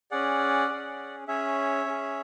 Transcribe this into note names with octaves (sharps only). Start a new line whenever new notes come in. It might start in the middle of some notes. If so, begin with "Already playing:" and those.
C#4 G#4 D5 F#5
C#4 G#4
C#4 G#4 C#5 E5
C#4 G#4